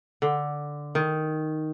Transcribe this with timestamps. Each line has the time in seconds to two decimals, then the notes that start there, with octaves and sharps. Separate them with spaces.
0.22 D3
0.95 D#3